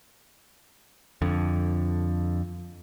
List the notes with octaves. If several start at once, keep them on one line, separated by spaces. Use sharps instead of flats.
F2 D3